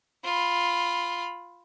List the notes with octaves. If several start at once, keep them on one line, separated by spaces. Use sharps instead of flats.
F4 B5